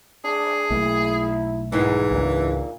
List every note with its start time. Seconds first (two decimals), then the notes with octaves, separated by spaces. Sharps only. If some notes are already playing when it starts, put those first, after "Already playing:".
0.24 D4 G#4
0.70 B1 A3 A#3 E4
1.72 E2 G#2 D#3 E3
2.11 C#2 A#2 A3 D4